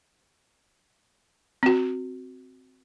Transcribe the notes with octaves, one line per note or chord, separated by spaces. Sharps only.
C4 F#4